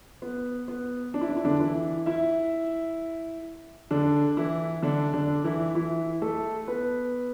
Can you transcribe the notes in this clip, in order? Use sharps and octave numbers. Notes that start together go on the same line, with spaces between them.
B3
B3
D4
E4
D4
E4
D3 D4
E3 E4
E4 E5
D3 D4
E3 E4
D3 D4
D3 D4
E3 E4
E3 E4
A3 A4
B3 B4